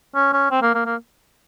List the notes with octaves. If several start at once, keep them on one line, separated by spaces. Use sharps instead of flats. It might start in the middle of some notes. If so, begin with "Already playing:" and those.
C#4
C#4
C4
A#3
A#3
A#3